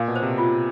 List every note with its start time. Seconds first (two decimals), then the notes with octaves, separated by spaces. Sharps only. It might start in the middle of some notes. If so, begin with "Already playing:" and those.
Already playing: A#2 F5
0.08 B2
0.16 C5
0.23 C3
0.38 F4